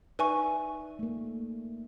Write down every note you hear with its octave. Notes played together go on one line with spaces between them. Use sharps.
D#4 B4 D5 E5 G#5 C#6
A3 A#3